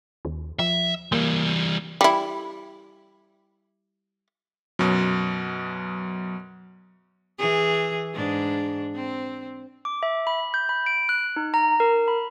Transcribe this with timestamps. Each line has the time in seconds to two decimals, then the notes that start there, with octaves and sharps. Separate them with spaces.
0.25 D#2
0.59 F3 E5
1.12 E3 G3 A#3
2.01 G3 E4
4.79 F#2 B2 F#3
7.39 E3 G#4
8.14 G#2 D4
8.95 C4
9.85 D6
10.03 E5
10.27 B5
10.54 G6
10.69 B5
10.86 D7
11.09 F#6
11.36 D#4
11.54 A#5
11.80 A#4
12.08 B5